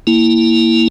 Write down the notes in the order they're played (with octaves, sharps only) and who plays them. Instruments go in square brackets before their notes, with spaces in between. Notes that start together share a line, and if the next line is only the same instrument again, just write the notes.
[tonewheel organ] A#3 E4